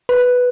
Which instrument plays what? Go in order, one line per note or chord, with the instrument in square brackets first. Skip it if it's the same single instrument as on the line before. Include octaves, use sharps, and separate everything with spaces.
[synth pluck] B4